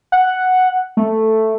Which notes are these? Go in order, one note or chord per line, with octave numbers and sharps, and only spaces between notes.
F#5
A3